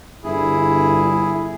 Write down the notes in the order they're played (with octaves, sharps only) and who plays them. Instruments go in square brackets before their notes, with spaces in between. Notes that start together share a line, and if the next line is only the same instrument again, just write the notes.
[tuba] G1 [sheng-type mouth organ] E4 G#4